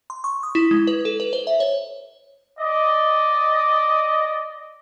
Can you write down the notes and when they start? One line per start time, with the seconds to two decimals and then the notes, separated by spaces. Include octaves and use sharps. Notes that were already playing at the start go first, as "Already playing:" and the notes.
0.10 C6
0.24 C#6
0.43 D#6
0.55 E4
0.71 G#3
0.87 B4
1.05 A4
1.20 B4
1.33 C5
1.47 E5
1.60 C#5
2.59 D5 D#5